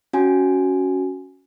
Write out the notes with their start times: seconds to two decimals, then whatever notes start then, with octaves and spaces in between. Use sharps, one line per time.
0.13 C#4 F#4 G#5